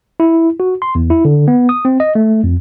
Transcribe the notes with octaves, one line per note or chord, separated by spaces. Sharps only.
E4
F#4
C6
E2
E4
D3
B3
D#6
C4
D#5
A3
F2